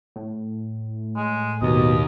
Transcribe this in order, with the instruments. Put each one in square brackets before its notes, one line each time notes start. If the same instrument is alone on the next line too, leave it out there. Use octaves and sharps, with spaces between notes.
[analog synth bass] A2
[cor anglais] G#3
[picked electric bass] D#2 [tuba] B2 [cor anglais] D#5